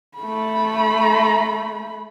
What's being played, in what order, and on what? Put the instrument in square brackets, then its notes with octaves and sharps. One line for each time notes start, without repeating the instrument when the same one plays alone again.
[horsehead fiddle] A3 B5